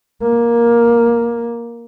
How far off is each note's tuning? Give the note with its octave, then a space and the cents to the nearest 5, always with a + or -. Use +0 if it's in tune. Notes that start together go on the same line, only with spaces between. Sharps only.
A#3 +10